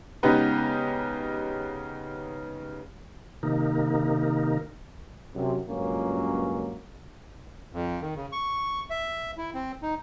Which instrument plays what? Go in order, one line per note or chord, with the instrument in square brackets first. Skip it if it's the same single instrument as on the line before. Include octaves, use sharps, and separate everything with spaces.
[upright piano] C#3 G#3 B3 D#4 G4 B4
[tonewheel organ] C3 D#3 A#3 D#4
[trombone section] F#2 C3
C#2 G2 A#2 F#3 A#3 C#4
[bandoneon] F2
D#3
C#3
C#6
E5
E4
C4
D#4